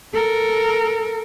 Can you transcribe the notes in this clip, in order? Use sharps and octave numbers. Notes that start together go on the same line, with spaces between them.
A4 A#4